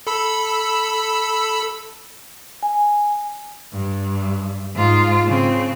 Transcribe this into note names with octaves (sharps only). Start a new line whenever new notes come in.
A4 B5 E6
G#5
G2
G#2 F4
C#3 C4